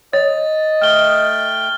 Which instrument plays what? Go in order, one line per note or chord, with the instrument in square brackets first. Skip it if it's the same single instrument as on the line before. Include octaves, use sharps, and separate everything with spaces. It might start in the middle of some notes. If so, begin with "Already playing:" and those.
[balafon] C#5 [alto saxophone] D#5 [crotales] A6
[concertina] A3 G5 [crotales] F6 G7